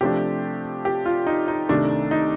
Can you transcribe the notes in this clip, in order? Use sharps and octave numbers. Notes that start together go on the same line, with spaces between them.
C3 F3 A3 D4 G4
G4
F4
D#4
D#4
C2 C3 D#3 A3 D4
D#4